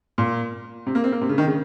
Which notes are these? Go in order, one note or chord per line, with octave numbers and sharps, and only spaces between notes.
A#2
C3
A#3
C4
A#3
C3
C#3
D#3
C#3